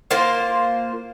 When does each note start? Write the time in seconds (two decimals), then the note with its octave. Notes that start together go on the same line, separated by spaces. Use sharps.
0.11 A#3 F4 C5